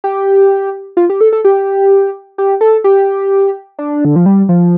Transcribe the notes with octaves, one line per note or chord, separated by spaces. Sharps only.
G4
F4
G4
A4
A4
G4
G4
A4
G4
D4
D3
F3
G3
F3